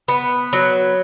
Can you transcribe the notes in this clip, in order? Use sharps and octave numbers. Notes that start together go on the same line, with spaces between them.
B3
F#3